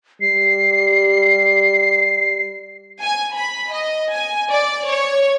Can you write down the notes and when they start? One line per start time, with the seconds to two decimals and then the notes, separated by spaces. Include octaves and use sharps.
0.21 G3 C7
3.01 G#5
3.35 B5
3.72 D#5
4.13 G#5
4.52 D5
4.90 C#5